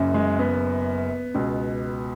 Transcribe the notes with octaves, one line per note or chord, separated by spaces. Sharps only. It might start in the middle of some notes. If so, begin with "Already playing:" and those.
Already playing: F#1 F#2 C#3
G#3
B3
C#2 B2